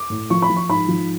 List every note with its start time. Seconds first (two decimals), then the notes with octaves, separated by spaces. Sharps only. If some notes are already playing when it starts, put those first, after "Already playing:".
Already playing: D6
0.10 A2
0.30 F3 C#6
0.42 B5
0.49 F3
0.56 C#6
0.69 G#2 B5
0.88 F3